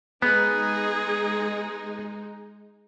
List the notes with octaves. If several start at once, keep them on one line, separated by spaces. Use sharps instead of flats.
G#3 B3 D#4 G#4